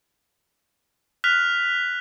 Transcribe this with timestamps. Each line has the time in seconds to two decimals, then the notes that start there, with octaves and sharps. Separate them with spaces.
1.24 F6 F#6 B6 F7